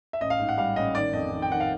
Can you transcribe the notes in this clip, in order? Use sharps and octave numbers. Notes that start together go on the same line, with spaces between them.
E5
A1 D#5
F5
G#2
F#5
G3 F5
A1 D#5
D#3 D5
F2 D#5
D#3
G5
D#3 F#5
F5